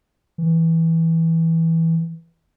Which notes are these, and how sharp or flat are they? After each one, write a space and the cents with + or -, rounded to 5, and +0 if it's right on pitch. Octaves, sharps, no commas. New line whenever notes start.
E3 -10